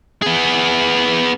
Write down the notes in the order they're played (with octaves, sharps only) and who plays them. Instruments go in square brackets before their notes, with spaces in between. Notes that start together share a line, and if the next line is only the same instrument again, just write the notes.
[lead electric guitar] B3 G#4